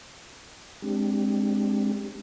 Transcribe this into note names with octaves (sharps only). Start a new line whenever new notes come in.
G#3 C4 D4 G4